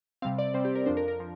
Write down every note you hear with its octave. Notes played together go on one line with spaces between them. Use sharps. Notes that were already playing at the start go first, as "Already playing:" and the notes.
C3 G3 C4 F5
D5
C3 G3 C4 C5
G4
A#4
F2 F3 D4 C5
A#4
A#4
F3